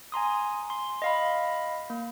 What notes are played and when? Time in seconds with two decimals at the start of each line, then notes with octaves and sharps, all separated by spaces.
0.12 G#5 A#5 C6 D#6
0.70 C6
1.02 D#5 F5 B5
1.90 A#3